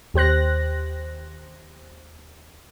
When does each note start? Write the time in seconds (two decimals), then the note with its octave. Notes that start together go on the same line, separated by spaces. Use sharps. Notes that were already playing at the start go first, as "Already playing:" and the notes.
0.14 D#2 G4 C5 F#6 A#6